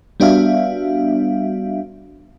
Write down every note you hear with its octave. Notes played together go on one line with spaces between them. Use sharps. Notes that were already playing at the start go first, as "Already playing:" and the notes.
G3 B3 D4 F#4 E5 F5